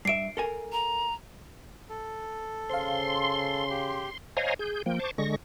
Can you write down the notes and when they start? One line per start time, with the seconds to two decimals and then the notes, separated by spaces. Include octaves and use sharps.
0.05 G2 E5 C7 D7
0.37 A4 A#4 G#5
0.72 A#5
1.89 A4
2.70 C#3 C5 F5 C6
3.70 G4
4.37 C5 C#5 D#5 F5 G#5 A#5
4.59 G#4 G6
4.86 F3 A#3 G5
4.99 C5 A5 C#6 D6
5.18 D3 G#3 C#6 A#6